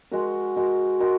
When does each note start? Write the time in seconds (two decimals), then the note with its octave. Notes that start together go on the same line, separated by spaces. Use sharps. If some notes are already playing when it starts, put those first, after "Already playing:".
0.11 G#3 F#4 A#4
0.56 G#3 F#4 A#4
1.00 G#3 F#4 A#4